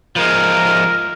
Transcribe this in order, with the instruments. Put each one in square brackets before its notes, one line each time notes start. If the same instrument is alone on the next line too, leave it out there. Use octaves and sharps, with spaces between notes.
[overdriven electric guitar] F3 G#3 [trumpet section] A#4